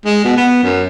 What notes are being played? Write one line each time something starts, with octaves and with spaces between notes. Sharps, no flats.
G#3
B2
B3
F#2